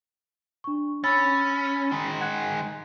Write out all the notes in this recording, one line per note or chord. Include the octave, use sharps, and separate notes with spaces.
D4 C#6
C#4 B5 E6 A6
D#3 G#3
F#5 F#6 G#6